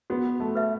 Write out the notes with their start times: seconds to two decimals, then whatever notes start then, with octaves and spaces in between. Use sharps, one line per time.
0.10 B3 F#4
0.40 A3
0.55 B4 E5